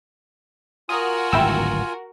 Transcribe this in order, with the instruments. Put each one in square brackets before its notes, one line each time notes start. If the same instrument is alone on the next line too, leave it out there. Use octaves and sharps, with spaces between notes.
[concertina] F4 G#5 [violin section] F#4 A#4 [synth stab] D#6
[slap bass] D1 G#1 G2 [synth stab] E4 G5 E6